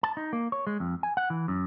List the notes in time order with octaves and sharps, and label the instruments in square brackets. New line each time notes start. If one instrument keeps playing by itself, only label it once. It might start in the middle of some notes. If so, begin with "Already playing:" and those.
[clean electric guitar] A5
D#4
A#3
C#5
G#3
F2
G#5
F#5
E3
F#2